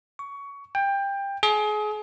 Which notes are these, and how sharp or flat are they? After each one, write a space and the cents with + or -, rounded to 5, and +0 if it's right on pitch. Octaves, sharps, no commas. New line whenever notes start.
C#6 +20
G5 +20
G#4 +30